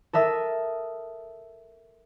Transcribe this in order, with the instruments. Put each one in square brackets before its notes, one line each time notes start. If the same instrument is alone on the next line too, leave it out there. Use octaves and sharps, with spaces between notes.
[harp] A4 A#4 E5 D#6